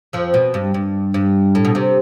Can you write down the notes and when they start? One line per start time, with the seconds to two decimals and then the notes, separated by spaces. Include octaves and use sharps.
0.13 F2 F3
0.34 B2
0.54 G2
0.74 G2
1.14 G2
1.55 A2
1.65 B2
1.75 C3